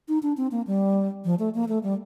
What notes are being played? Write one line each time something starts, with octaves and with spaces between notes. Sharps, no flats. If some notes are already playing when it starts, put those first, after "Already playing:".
D#4
D4
C4
A#3
G3
F3
A3
A#3
A3
G3